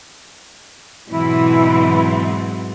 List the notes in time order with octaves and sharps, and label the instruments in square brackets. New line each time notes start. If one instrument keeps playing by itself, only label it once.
[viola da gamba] G#2 F#3 C4 [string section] B2 E3 [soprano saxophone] E4